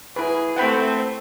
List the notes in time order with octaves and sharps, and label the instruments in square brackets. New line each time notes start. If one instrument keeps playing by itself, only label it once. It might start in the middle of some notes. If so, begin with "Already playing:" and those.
[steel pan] E4 B4 [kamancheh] G#4
[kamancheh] A3 C4 [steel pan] F#5 G5 B5